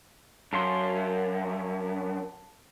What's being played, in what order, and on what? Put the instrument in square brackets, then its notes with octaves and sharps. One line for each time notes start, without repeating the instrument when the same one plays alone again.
[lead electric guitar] F#2 [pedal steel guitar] A4 F5 C6